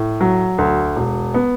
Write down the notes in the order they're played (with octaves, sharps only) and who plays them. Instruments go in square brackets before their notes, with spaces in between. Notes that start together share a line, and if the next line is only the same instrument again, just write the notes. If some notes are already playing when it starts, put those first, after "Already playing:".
Already playing: [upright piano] A2
F#3
D2
E1
B3